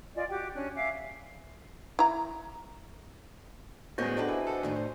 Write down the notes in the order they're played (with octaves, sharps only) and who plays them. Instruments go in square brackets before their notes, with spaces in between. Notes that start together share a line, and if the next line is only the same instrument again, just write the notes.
[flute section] F4 D5 D#5 G#5
F#4 G4 G5 D6
C#4 D4 F#6
E5 F5 G#5 D6
[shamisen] E4 A#5
[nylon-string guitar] D2 A2 B3 [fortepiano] G#3 C#4 [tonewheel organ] F#4 C5 D#5
[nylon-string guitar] D4 G4 B4 [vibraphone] A4 F#5
[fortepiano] E4 [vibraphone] G#5
[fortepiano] A4 F#5
[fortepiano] D#2 [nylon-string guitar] A2 D4 D#4
[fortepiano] C5